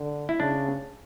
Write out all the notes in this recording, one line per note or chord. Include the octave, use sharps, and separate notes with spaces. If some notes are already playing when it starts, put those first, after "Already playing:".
Already playing: D3
E4
C#3 D4